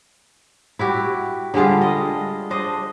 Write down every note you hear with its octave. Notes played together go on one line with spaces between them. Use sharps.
E4 F#4 G4
D3 G3 G#3 F4
D#5
D4 C5 D#5